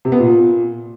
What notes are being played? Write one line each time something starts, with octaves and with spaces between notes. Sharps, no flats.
C3
B3
A#2